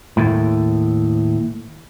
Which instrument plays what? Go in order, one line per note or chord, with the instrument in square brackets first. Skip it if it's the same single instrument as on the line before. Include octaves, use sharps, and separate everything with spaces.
[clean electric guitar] D#2 A2